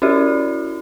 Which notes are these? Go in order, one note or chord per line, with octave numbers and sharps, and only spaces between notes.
C#4 E4 F#4 G4 D5